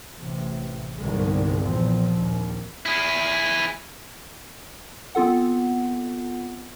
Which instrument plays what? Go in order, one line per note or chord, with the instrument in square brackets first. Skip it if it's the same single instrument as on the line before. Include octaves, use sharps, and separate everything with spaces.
[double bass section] A1 C3
C2 G2 B2 D3 D#3 G#3
B1 E2 A#2 F3 C4
A#1 D#2
[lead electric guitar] E4 G#4
[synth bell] B3 C4 F4 A4 F#5